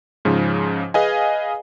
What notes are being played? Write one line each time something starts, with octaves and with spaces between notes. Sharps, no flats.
G#2 C#3 F3
G#4 B4 D#5 F5 G#5